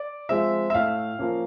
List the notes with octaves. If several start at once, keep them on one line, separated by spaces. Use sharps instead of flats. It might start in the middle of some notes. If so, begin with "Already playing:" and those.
Already playing: D5
F3 G#3 C4 E5
E5
A2 F5
F3 A#3 C#4